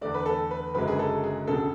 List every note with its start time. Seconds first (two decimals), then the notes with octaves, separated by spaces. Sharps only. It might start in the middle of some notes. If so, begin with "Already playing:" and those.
0.01 E2 D3 A3 D5
0.14 B4
0.26 A4
0.51 B4
0.74 F#1 F#2 D3 G#3 B4
0.88 G#4
0.99 A4
1.24 G#4
1.47 E1 D2 C#3 A4